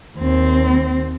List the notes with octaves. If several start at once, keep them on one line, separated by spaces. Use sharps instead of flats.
D#2 C4